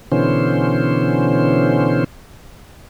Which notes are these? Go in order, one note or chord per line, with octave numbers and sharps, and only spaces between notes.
B2 D3 E3 C#4 C5